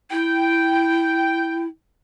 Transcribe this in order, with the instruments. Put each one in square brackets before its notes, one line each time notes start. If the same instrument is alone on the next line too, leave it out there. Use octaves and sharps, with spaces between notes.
[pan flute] E4 [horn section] G5